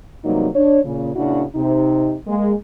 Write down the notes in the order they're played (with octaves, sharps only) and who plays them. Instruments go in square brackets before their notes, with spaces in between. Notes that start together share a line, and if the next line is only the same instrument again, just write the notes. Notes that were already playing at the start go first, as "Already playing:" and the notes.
[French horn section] E2 C3 F#3 G3 A#3 D#4
D4 C#5
A#2 C#3
A#2 C#3 D4 E4 F#4
C3 D#4
G#3 A#3